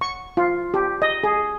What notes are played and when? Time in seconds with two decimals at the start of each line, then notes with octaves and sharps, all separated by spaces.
0.01 C#6
0.37 F4
0.74 G4
1.02 D#5
1.23 G#4